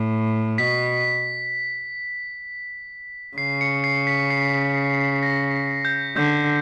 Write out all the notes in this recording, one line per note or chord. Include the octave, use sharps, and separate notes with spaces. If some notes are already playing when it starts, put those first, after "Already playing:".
Already playing: A2
B2 B6
C#3 C7
C#7
C7
B6
C7
A#6
G6
D3 G6